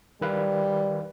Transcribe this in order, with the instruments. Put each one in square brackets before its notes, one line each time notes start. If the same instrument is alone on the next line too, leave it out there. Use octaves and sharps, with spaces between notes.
[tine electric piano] D#3 B4 F5 [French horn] G3